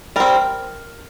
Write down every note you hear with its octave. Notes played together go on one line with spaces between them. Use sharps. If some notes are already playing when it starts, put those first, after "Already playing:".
G3 C4 A#4